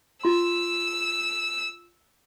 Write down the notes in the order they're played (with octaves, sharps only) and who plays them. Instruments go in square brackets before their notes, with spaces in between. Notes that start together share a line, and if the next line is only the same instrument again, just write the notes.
[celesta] F4 C6 [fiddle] E6